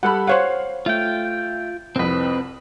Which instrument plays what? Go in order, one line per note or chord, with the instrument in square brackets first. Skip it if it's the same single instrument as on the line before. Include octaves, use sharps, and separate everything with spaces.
[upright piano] G3 A4 B5 [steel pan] F#5
[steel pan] C5 C#5 F#5 [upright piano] F5
[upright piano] A3 [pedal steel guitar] F4 G5
[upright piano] C2 F2 [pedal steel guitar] C4 B4